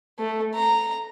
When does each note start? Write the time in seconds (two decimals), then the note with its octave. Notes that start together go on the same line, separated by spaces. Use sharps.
0.19 A3
0.55 A#5